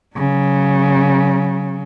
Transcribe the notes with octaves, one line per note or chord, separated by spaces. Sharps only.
C#3 F#3